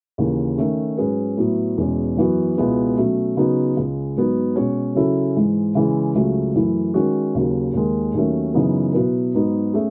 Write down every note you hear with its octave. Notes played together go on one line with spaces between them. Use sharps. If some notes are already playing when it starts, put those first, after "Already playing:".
D#2 C#3 E3
D#3 A3 C#4
G#2 F#3 C#4 G#4 B4
A2 F#3 B3 E4
E2 B2 G#3 C#4
F#2 E3 B3 F#4
C#2 B2 G#3 B3 E4
B2 F#3 A3 C#4
C#3 F#3 B3 D#4 F#4
C#2 C#3 G#3
G#2 F#3 B3 D#4
B2 G#3 C#4 F#4 C#5
C#3 F#3 C#4 E4 A4
G#2 E3 G#3
C#3 E3 G#3
C#2 C#3 F#3 A3 C#4
F#2 E3 A3 E4
D#3 G#3 C#4 F#4
D#2 C#3 F#3
D#2 D#3 G#3
D#2 D#3 F#3 A3 C#4
F#2 C#3 E3 B3 D#4
B2 F#3 B3 E4 B4
G#2 F#3 B3 D#4 F#4
A3 C#4 G#4